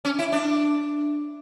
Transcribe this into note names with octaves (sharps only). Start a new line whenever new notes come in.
C#4
E4
D4